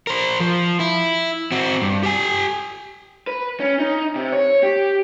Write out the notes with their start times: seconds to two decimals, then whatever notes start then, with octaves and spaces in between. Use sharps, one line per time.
0.07 A#4 C5
0.40 F3
0.80 E4
1.52 C4 F#4
1.82 G2
2.03 G4 G#5
3.27 B4
3.60 C#4
3.79 D#4
4.15 C3
4.32 C#5
4.63 G4